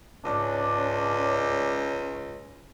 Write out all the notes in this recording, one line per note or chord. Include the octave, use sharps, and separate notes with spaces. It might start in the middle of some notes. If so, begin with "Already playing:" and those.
C#2 G#2 C#4 D4